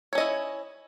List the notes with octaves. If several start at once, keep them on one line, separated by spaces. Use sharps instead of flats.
C#4 E4 C#5 D#5